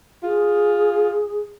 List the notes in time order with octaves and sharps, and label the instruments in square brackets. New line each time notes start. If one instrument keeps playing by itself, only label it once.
[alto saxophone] F4 [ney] G#4